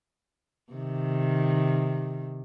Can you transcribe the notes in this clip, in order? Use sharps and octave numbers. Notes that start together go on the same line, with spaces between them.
C3 D#3